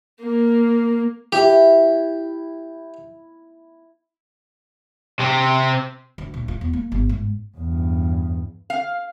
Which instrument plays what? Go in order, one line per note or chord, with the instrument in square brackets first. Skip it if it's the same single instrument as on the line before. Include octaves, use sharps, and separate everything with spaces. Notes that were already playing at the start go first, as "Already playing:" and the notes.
[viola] A#3
[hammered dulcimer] E4 [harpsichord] G4
[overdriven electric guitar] C3 C4
[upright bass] D2
A#1
F4
E2
A#3
G1
G#2
[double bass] E2 G2
[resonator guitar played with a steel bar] F5